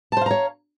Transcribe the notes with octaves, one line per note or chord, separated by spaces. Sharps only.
C5 C#5 F5 A5 A#5